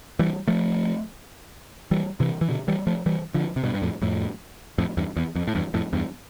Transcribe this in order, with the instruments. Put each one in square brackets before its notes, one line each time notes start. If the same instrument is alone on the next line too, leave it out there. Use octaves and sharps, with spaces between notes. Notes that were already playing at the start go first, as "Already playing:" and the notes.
[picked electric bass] E3 G3
F3 A3
E3 G3
C3 E3
E3
B2 D3
E3 G3
F3 A3
E3 G3
D3 F3
C3
G2 B2
G2
F2 A2
F2 A2
F2 A2
E2 G2
E2
F2
A2
E2 G2
F2 A2
E2 G2